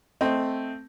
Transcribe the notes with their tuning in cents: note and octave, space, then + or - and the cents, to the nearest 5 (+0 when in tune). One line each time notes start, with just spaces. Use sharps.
A3 +0 C4 +0 D#5 +0